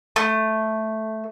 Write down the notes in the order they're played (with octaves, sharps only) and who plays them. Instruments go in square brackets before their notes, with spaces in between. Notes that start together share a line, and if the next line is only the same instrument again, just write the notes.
[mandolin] A3